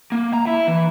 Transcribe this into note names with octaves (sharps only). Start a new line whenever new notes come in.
A#3
A#5
E4
E3